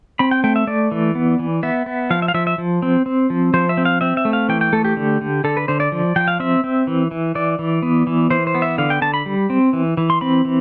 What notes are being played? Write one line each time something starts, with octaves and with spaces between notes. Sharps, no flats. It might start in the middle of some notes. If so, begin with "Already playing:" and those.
C4 B5
G5
A3 G5
E5
A3 D5
E3
B3
E3
B3 E5
B3
F3 F5
E5
F5
F3 E5
E5
F3
C4
C4
F3
F3 C5
E5
C4
F5
C4 E5
E5
A3
F5
E3 G5
G5
A3 A4
G4
D3
D3
D3 A4
B4
D3 C5
D5
F3
F3 G5
F5
C4 E5
C4
E3
E3
E3 D5
E3
B3
E3
E3 C5
C5
B3
E5
D3 F5
G5
D3 A5
B5
G3
C4
E3
E3
C6
C4 B5
E3